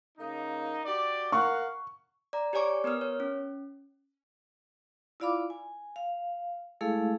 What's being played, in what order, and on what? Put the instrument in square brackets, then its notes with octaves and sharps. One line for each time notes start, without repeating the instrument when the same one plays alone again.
[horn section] C#3 A#3 D#4
F#4 G4 D5
[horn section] A#4 F5 F#5 [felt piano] C#6
[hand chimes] D5 A#5
G4 C#5 D5 G#5 C#6 D6
B3 A#4 D#6 F6
C#5
C#4
[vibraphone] E4 F4 D5 F5 B5 D6
G#5
F5
G#3 A3 E4 G#4 A4 F5